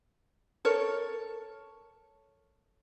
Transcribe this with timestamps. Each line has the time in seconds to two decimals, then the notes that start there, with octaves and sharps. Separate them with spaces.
0.65 A4 A#4 C#5